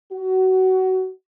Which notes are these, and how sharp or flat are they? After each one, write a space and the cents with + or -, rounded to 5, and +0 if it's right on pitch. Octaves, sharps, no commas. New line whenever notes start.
F#4 +20